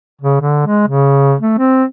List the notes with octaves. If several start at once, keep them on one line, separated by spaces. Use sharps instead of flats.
C#3
D3
G#3
C#3
A3
C4